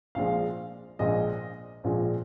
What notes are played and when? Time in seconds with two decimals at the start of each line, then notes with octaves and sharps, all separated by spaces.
0.15 A#1 A#2 F3 G#3 F5
0.99 A#1 A#2 F3 G#3 D#5
1.84 A#1 A#2 F3 G#3